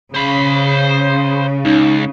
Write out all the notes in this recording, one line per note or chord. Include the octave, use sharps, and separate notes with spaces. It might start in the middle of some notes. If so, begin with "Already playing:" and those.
C#3 C5 B5
C#2 D#4